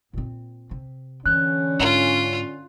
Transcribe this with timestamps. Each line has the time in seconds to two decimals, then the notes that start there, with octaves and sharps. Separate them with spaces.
0.13 A#2 C4
0.71 C3
1.26 D3 E3 C#4 F#6
1.80 G#2 F4